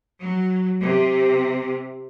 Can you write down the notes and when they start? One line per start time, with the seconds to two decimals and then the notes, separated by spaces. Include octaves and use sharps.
0.21 F#3
0.81 C3